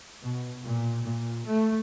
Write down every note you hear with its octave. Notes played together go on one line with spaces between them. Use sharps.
B2
A#2
A#2
A3